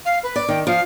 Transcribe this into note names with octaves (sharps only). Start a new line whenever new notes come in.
F5
B4
D5
D#3 G5
F3 F5